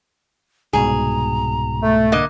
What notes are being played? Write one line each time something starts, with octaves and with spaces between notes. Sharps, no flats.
C2 G#2 B2 G#4 A#5
A3
D3 A#3 D#5